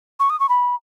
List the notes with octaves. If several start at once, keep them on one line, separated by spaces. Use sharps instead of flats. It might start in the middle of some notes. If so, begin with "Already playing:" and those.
C#6
D#6
C#6
B5